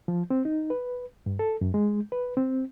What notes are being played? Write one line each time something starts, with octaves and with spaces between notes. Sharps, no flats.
F3
C4
D#4
B4
G2
A4
F#2
G#3
B4
C4